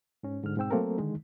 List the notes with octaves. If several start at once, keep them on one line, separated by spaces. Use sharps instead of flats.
G#2 C#4
G#2 D3 F6
G#2 B2 C4 G5 E6
F#3 A3 A#3 C4 A4 A#4
D3 D#3 G#3 D#4